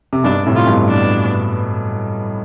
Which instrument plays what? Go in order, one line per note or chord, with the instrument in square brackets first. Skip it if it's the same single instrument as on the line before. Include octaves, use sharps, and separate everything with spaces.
[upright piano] C3
[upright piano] G2 B2 [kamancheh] D4
[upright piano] A2 C3
[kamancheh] F4
[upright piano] G2 B2
[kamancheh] D4